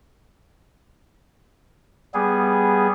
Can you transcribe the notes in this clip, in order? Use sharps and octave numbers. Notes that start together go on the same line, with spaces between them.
G3 B3 G#4